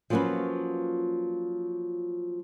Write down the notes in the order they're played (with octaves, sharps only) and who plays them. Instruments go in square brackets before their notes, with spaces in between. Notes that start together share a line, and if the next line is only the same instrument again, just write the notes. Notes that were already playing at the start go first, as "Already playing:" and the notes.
[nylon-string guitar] F3 F#3 A#3 C#4 F4 B4